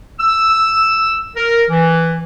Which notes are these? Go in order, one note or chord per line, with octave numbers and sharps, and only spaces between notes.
E6
A#4
E3